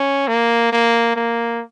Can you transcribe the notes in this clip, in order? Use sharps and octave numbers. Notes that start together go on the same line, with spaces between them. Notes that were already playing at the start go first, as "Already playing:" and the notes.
Already playing: C#4
A#3
A#3
A#3